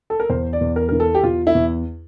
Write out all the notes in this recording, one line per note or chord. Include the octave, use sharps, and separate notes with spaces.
A4
A#4
E2 C5
D5
E2
A#4
E3 A#4
A4
G4
E2 F4
E4
E2